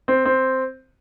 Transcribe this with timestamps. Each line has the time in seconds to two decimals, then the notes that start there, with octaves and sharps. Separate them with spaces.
0.08 C4
0.25 C4